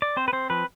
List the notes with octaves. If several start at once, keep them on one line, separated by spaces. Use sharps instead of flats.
D5
C4 C5
B4
C4 C5
F3 B4